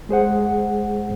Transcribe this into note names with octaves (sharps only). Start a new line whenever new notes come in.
G#3 G#4 C5 F#5